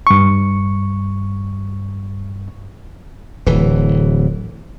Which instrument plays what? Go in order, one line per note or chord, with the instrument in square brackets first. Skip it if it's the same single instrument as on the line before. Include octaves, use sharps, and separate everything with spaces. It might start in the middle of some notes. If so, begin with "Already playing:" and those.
[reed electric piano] G2 C#6
[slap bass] D1 E3